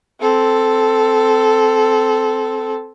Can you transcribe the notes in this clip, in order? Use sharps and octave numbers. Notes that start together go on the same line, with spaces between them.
C4 A4